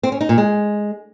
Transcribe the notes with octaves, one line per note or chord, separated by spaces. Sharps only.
C4
C#4
D#4
A#2
G#3